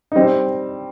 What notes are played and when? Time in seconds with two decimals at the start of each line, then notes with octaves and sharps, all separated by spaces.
0.12 D#4
0.16 G3 C4